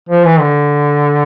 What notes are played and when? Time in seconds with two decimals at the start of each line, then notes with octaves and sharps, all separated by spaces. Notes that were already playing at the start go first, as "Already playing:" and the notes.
0.09 F3
0.25 E3
0.40 D3